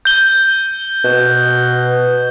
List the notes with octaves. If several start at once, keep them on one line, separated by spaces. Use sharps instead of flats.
G6 G7
B2